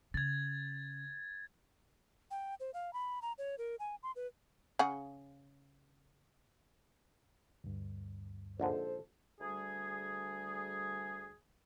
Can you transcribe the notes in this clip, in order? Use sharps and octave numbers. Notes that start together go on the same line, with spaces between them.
C#3 G#6 A6
G5
C5
F5
B5
A#5
C#5
A#4
G#5
C6
B4
C#3 G#4 F#5
D2 G2
A#1 G#2 D3 A4 C5
D2 G3 G#4